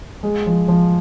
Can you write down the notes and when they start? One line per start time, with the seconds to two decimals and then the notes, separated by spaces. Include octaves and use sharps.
0.23 G#3
0.46 F3
0.68 F3